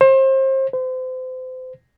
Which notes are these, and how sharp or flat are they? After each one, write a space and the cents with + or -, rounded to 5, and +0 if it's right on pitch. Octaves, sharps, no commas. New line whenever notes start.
C5 +30
C5 -35